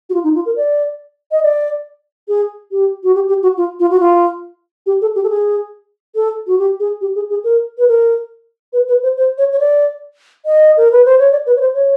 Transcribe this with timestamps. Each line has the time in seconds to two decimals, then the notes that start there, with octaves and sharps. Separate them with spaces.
0.10 F#4
0.14 F4
0.24 D#4
0.35 F4
0.46 A#4
0.57 D5
1.31 D#5
1.43 D5
2.28 G#4
2.72 G4
3.04 F#4
3.15 G4
3.28 G4
3.43 F#4
3.57 F4
3.80 F4
3.91 F#4
4.00 F4
4.86 G4
5.02 A4
5.15 G4
5.24 A4
5.30 G#4
6.15 A4
6.47 F#4
6.59 G4
6.80 G#4
7.01 G4
7.15 G#4
7.30 G#4
7.44 A#4
7.78 B4
7.88 A#4
8.73 B4
8.88 B4
9.03 C5
9.17 C5
9.38 C#5
9.52 C#5
9.59 D5
10.46 D#5
10.77 A#4
10.92 B4
11.05 C5
11.19 C#5
11.32 D5
11.46 B4
11.57 C#5
11.61 C5
11.75 C#5